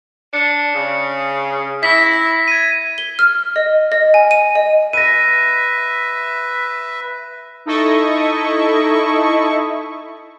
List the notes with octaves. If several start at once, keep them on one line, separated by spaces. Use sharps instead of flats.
D4 C#7
C#3
E4 A#6 B6
G#6 D#7
G7
F6
D#5
D#5
G#5
D#7
D#5
B4 E5 A#6 D#7
D#4 E4 A4 D#5 C#6